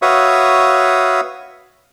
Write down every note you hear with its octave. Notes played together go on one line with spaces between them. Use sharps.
F#4 B4 C#5 E5 F5 D#6